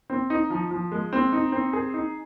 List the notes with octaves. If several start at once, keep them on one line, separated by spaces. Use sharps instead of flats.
C4
D#4
F3
F3
G#3
C4
D#4
C4
G#4
D#4